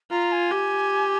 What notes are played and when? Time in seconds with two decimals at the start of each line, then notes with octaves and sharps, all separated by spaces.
0.11 F4 A#5
0.32 G#5
0.51 G4